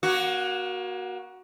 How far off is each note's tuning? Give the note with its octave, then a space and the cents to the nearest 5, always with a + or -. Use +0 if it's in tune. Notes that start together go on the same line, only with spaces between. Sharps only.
A#3 +30 F#4 +0